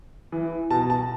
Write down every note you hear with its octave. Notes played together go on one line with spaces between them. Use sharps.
E3
B2 A5
A5